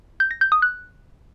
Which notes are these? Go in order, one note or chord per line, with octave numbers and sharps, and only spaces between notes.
G6
A#6
G6
D#6
F#6